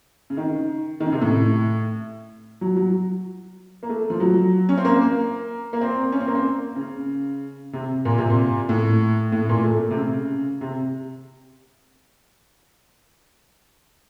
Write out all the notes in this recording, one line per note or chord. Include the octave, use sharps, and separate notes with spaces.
C#3
D#3
D#3
C#3
C3
A2
F#3
F#3
A#3
A3
F3
F#3
C#4
C4
A#3
A#3
A#3
C4
C#4
C4
A#3
C4
C#3
C3
A#2
C3
A#2
A2
A2
A#2
A3
C3
C#3
C3